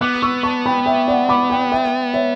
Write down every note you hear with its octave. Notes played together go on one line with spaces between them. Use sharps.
B3 D6 F#6
C#6 E6
A5 C#6
G5 B5
E5 G5
D5 F#5
B5 D6
G5 B5
E5 G5
C#5 E5